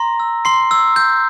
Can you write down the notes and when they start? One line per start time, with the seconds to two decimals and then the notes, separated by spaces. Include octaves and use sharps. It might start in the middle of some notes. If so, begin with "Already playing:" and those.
Already playing: A#5 C6 A#6
0.20 E6
0.45 C6 C7
0.71 E6
0.96 G6